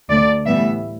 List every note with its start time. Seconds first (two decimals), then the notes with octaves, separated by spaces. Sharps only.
0.09 D2 D3 A3 D5
0.46 A2 E3 G3 B3 E5